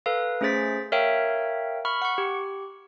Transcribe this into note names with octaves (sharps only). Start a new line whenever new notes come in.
A4 B4 F5
A3 C#4 G#4 C5 A6 B6
A#4 C#5 E5 F5 G5
B5 C#6 F6
F#5 C#6
G4